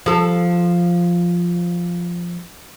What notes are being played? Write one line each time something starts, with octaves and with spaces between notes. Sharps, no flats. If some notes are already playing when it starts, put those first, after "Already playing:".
F3 A4